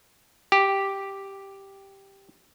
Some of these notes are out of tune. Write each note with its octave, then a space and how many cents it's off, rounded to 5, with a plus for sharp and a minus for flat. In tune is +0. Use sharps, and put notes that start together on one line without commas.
G4 +0